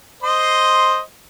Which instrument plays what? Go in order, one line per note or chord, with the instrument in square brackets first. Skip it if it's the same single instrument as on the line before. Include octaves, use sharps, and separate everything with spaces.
[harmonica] C5 D#5 C6